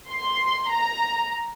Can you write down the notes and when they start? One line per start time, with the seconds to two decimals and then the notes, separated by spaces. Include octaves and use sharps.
0.11 C6
0.71 A#5